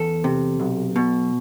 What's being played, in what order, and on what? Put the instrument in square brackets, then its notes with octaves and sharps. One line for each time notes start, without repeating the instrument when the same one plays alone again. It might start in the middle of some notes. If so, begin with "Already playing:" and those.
Already playing: [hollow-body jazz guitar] E2 A4
C3
B1
B2